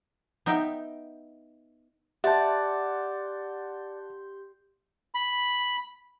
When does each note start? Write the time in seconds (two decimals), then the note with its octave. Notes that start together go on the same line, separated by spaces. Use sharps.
0.46 B3 D#4 E5 G5
2.24 G4 D5 E5 F#5 A5 C6 G6
5.15 B5